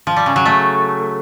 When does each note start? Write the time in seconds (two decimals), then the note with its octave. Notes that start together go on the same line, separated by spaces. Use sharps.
0.07 F3
0.16 G3
0.26 C#3
0.36 F#3
0.46 A3